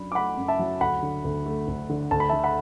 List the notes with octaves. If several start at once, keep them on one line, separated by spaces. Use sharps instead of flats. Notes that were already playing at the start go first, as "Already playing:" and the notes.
Already playing: F#2 F#3 D4 B5
D6
A3 F#5 B5
F#2
E5 A5
F#3
D2 F#5 B5
D3
D2
A3
D2
D3
D2 A5
B5
D3 E5 A5
F#5 B5